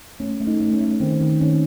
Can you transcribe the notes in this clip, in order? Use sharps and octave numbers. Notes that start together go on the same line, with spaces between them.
A3 C#4
A3
D#4
A3
C#4
A3
D#3 C4
D#3
D#3 C#4